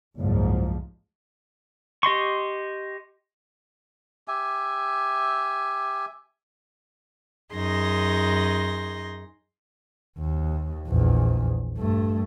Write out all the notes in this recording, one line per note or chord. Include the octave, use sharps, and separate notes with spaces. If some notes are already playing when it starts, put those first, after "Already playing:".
F#1 C2 G#2 F3
G4 D#5 C6 C#6
G4 E5 G#5
F#2 D#4 G#4 C6 A#6
D#2
A#1 E2
G2 A3